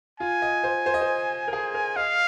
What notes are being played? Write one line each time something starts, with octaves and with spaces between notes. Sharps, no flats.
F4 G#5
D#5
C5
C5
D#5
C5
A#4
G#4
A#4
D#5 F5